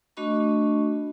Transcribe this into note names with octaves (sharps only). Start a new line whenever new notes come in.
A3 D4 F#4 D#5 B5 C#6